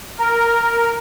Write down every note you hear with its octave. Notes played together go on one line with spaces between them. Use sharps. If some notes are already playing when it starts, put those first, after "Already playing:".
A#4